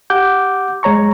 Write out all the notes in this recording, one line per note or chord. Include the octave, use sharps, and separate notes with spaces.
G4 F#5 D6 G6
F#2 G#3 C#5 A#5 C#6